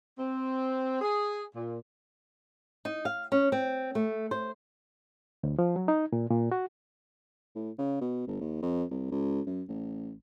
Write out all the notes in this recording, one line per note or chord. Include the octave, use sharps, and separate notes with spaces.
C4
G#4
A#2
D#4
F5
C#4
C4
A3
C5
D2
F3
F#3
D#4
A#2
A#2
F#4
A2
C#3
B2
G1
D#2
F2
C2
C#2
F#2
A1